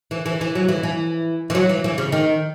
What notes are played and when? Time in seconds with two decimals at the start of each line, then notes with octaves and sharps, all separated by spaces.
0.11 E3
0.26 E3
0.41 E3
0.55 F#3
0.69 E3
0.83 E3
1.50 E3
1.55 F#3
1.69 E3
1.84 E3
1.98 C#3
2.12 D#3